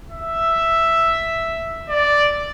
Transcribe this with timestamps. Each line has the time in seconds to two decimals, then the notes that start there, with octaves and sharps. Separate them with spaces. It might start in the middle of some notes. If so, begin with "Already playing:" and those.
0.10 E5
1.89 D5